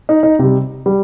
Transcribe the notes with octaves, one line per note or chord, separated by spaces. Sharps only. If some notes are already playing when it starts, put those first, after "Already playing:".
D#4
D#4
C3 G3
G3